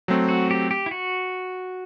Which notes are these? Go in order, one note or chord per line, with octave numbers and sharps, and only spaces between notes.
F#3 A3 C4
F#4
G4
G4
E4
F#4